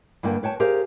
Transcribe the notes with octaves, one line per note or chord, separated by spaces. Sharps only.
G2 D3 A#3 B3 G5
B4 C#5 G5 A5
G4 G#4 A#4 C5 F5